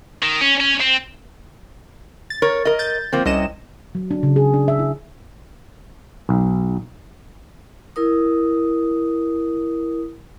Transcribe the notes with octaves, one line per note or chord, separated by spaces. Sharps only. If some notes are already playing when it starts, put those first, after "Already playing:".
D#3
C#4
C#4
C4
A6
A#4 C#5
A#4 D#5
G6 A6
F3 A#3 C4
C2 C#4 D#5 E7
F#3
D4
C#3
G#4
D4
E5
E4
B1
E4 A#4 D#6